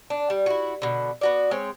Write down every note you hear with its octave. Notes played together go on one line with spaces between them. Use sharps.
D4
G3
E4 F#4
B2 D3
B3 F#4 D5
G#3 C4 C#5